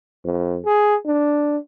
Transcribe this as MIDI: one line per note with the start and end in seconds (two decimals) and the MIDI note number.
0.24 0.59 41
0.65 0.95 68
1.06 1.57 62